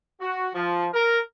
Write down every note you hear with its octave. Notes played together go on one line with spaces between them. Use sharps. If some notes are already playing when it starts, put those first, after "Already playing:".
F#4
F3
A#4